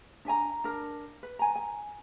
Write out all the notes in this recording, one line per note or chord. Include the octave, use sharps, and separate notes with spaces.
D4 E5 G#5 A#5
D4 A#4
B4
G#5 A#5
G#5